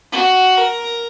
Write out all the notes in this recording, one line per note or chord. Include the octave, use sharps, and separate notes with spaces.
F#4
A#4